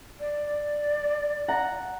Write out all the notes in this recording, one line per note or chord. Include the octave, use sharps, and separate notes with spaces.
D5
F#5 A#5